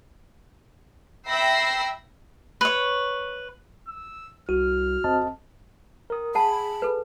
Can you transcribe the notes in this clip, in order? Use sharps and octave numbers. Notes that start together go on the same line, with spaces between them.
E5 G5 B5 E6 A#6 C7
B4 C#5
E6
C2 F#4 F6
F2 C4 D#5 A5
A#4 D#6
G#4 F#5 A5 B5
A4 B4